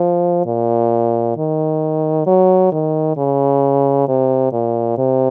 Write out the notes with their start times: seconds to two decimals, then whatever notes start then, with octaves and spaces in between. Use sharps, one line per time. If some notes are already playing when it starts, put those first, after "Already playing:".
Already playing: F3
0.46 A#2
1.37 D#3
2.27 F#3
2.72 D#3
3.17 C#3
4.08 C3
4.53 A#2
4.98 C3